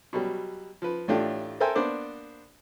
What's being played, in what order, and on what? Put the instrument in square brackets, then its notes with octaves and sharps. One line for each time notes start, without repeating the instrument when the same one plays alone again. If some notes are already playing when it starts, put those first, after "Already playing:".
[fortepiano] B2 F#3 G3
F3 B4
A1 A2 A3 D4 F4 G4
A4 A#4 C5 E5 G5 G#5
A#3 B3 D4 C5 D5